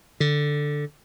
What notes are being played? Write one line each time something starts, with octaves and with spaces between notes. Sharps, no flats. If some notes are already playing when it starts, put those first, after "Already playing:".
D3